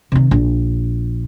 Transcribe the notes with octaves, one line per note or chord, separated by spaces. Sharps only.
C3 D#3
A#1